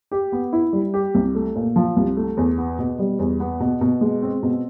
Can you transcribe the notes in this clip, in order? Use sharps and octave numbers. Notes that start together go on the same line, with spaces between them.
G4
B3
E4
G3
G4
C2
A3
A#2
F3
C2
A3
E2
B3
B2
G3
E2
B3
B2
B2
G#3
C4
B2